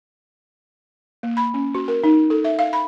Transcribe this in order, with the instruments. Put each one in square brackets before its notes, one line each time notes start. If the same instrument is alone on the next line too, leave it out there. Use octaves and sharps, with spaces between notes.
[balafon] A#3
B5
C#4
F#4
A#4
D#4
A4
E5
F5
B5